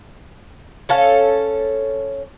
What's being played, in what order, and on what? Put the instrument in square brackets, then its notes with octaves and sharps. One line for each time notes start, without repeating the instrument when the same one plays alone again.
[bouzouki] C#4 A4 F5